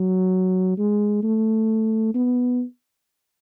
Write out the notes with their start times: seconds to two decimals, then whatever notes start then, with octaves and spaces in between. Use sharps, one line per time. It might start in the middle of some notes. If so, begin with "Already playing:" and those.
Already playing: F#3
0.78 G#3
1.23 A3
2.14 B3